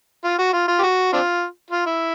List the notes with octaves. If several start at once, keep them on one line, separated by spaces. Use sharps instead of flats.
F4
F#4
F4
F4
G4
F#4
C4 D4 F4
F4
E4